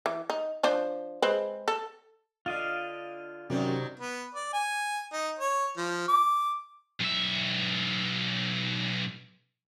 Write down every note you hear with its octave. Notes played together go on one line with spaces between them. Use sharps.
E3
D#4
F3 D4 C5
G#3 C4 B4
A4
D3 F4 D#5 F5
F#2 C3 D#3 F#3 G3
B3
D5
G#5
D#4
C#5
F3
D6
B1 E5